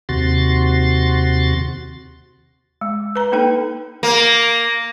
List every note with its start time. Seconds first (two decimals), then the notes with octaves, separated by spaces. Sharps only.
0.09 D#2 C3 F#4 C6 A6
2.81 G#3
3.16 B4 A#5
3.32 A#3 D4 D#4 A4 B4 G5
4.03 A#3